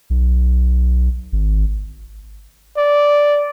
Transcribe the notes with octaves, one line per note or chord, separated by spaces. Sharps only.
B1
G#1
D5